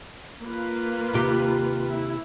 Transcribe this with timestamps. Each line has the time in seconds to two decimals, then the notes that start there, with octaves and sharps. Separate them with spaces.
0.42 A#3 F4 B4
1.13 D#2 C3 G4
1.92 E4